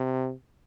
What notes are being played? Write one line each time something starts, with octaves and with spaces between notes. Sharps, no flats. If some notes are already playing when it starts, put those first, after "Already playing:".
Already playing: C3